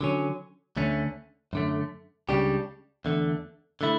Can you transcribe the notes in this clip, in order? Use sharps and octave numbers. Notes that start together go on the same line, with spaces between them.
D3 F#3 C#4
D2 D3 A3 C#4
F#2 D3 A3
C#2 C#3 G3 D4 G4
E2 D3 A3
D3 A3 E4